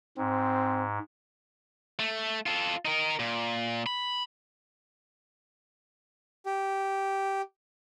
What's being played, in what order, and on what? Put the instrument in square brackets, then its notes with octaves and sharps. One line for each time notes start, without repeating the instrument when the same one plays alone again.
[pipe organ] G#2 [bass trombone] C4
[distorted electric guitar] A3
F4 A4
D#4 A#4
A#2
B5
[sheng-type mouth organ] G4